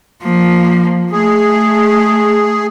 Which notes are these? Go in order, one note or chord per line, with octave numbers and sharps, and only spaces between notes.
F3 A#3
A3 G#4